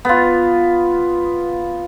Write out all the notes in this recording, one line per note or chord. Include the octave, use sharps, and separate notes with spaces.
B3 F4